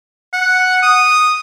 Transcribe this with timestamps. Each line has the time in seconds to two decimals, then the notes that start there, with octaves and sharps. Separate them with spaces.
0.33 F#5
0.83 D#6